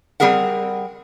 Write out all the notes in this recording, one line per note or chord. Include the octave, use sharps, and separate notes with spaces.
G3 C4 G#4 A#4 F#5